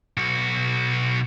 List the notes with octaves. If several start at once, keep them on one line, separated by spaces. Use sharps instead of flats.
B1 F#4